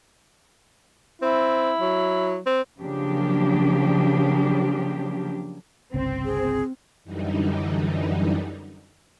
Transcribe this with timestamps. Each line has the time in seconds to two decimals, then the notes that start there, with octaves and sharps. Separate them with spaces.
1.22 C4 E4
1.80 F#3
2.46 C4
2.79 C#3 F3 F#3 A#3 D4 G4
5.94 G1 C2 C#3 C4
6.25 G#4
7.04 F#2 D3 E3 G3 D#4